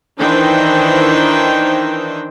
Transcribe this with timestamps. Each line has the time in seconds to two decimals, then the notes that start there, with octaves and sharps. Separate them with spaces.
0.18 D#3 E3 D4 D#4 C5 G5